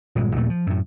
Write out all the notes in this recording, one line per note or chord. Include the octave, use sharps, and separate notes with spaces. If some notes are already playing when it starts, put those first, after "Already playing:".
D#1 A#1 G2 G#3
A#1 D#2 A#2 A3
F3
F#2 A2